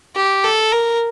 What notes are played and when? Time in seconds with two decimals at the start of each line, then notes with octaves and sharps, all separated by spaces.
0.16 G4
0.44 A4
0.72 A#4